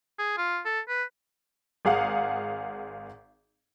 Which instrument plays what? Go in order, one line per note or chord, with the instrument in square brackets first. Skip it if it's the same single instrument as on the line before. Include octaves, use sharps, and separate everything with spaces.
[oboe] G#4
F4
A4
B4
[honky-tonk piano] G#1 G#4 F5 F#5